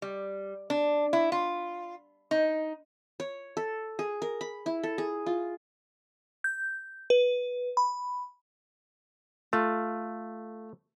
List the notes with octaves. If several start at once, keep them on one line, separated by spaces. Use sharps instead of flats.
G3
D4
E4
F4
D#4
C#5
A4
G#4
A#4
B5
E4
A4
G#4
F4
G6
B4
B5
A3 F4